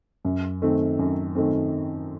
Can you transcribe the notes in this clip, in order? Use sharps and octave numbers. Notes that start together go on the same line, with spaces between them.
F#2
D#3 A3 C4
F#2
D#3 A3 C4